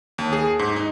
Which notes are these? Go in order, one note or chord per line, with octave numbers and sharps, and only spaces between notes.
D#2
G#4
G#2
D#4